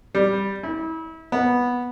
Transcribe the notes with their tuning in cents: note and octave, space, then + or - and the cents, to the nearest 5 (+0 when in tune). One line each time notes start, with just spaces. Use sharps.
G3 +0
E4 -35
B3 -10